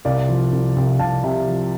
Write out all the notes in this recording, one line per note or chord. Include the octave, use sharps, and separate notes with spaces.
C2 D5 F5
F3
C2
C2
C2 F5 A5
C3
F3